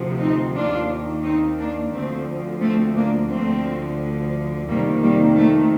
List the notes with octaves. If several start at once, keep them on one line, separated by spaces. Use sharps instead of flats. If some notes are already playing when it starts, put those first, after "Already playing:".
Already playing: D2 C3 F3
C4 D#4
D#2 D#3 D4 F4
C4 D#4
A#3 D4
D2 D3 F3 A3 C4
A3 C4
A#3 D4
D2 D3 F3 A3 C4
F2 C3 D#3 G3 A#3
G3 A#3
A3